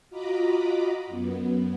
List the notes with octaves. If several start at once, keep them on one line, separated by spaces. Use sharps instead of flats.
F4 F#4 D#5 A#5 B5 D6
F#2 B3